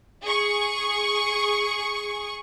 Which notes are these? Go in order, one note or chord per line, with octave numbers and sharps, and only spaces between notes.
G#4 C#6